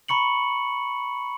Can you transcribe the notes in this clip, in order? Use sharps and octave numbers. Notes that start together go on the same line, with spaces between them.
A#5 B5 C#6 C#7 F#7